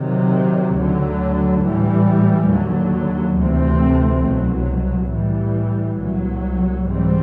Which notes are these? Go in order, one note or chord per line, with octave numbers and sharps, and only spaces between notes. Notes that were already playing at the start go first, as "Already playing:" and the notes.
Already playing: C3 D#3 F#3
D2 D3 F#3
A2 E3 G3
D#2 D3 F#3
D2 C3 E3 A3 C4
C2 B2 F#3
A2 E3 G3
C2 A#2 F#3
G#2 E3 G3 C4